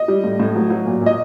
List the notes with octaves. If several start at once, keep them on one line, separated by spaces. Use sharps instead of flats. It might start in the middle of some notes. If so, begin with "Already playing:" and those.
Already playing: D#5
G3
A2
A2
F#3
F#3
A#2
A#2
D#5